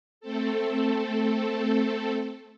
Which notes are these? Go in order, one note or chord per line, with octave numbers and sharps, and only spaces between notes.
A3 C4 A4